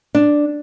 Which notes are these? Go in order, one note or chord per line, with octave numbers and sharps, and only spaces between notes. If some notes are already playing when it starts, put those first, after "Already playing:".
D4